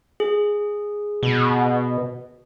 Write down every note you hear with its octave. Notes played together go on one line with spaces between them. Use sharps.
G#4
B2